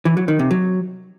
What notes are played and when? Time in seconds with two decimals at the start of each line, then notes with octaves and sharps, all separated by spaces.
0.05 E3
0.17 F#3
0.28 D#3
0.39 C3
0.51 F#3